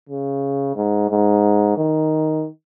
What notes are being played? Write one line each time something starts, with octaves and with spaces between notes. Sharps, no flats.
C#3
G#2
G#2
D#3